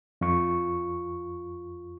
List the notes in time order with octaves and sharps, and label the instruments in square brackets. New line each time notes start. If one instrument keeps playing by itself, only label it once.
[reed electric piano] F2 F4 C#6